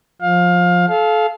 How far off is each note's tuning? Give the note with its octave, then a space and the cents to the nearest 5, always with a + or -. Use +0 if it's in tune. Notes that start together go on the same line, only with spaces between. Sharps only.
F3 +20 F5 +20
A4 -30 F5 +0